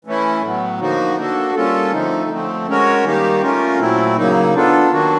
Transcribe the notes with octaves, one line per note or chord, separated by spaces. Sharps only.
E3 A3 C#4 E4
A2 F#3 B3
D3 F3 A#3 D#4 F#4
A#3 D4 F#4 A4
G3 A#3 C#4 F4 A4
D3 F3 A3 C4 D#4
D3 F3 A3 C4
G#3 C#4 F#4 A#4 C#5
D#3 G3 A#3 D#4 G4
A3 C#4 F4 A#4
A#2 F#3 A3 C4 E4
C#3 F#3 A#3 D#4
B3 D4 F4 A4
D#3 F#3 A#3 D4 F#4